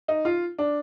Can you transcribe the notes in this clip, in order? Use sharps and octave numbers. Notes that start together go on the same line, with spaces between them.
D#4
F4
D4